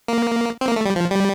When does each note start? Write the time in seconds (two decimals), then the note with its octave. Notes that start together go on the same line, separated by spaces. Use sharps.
0.08 A#3
0.61 C4
0.67 A#3
0.76 A3
0.86 G3
0.96 F3
1.11 G3